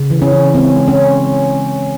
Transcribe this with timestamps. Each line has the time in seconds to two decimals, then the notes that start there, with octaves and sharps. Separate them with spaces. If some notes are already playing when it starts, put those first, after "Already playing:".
Already playing: C#3
0.11 E3
0.22 C#4
0.33 E3
0.54 G#3 C4
0.76 G#3
0.88 C#4
0.98 G#3